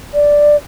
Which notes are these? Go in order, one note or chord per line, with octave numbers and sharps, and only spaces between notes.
D5